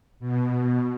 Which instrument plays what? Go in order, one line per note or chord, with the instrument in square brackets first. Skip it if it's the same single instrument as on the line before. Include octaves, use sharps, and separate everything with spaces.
[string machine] B2